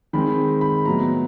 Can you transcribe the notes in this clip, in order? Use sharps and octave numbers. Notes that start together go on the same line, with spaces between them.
D#3 G#3 C4 B5
B5
A2 F#3 B3 A#5